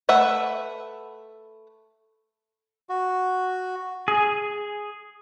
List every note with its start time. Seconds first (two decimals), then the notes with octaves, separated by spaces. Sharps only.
0.09 A3 B4 E5 F#5
2.89 F#4
4.08 G#4